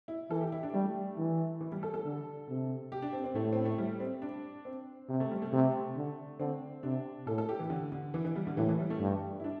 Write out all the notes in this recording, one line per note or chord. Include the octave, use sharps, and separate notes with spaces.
E4
E3 A4
G4
E4
D4
G3 A3
E3
E3
G3
A4
A4
D3
C3
G4
D4
C4
C4
A2 A3
C4
A3
G3
C4
D4
C4
C3
A3
G3
A3
C3
D3
D3 C4
C3 D4
A2 A4
A4
G4
E3
D3
D3
E3
E3
G3
D3
A2 E3
E3
G3
A3
G2
E4
D4